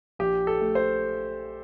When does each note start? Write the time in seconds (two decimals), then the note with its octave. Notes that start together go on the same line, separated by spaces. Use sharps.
0.19 A#1 G4
0.47 A4
0.61 A3
0.75 C5